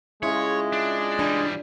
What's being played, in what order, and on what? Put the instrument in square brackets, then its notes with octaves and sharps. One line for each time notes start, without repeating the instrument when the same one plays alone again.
[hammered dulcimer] C#3 F4 [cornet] G#3 [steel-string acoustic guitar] E4 [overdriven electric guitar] C#5
[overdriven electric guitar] D4
[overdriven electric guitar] E3 G3 [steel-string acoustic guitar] D4